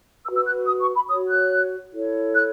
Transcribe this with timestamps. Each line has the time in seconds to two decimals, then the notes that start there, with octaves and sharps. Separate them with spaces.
0.25 F#4 B4 E6
0.36 E6
0.46 F#6
0.67 D#6
0.81 C#6
0.95 B5
1.09 F#4 C#5 D#6
1.29 F#6
1.92 E4 A4 C#5
2.34 F#6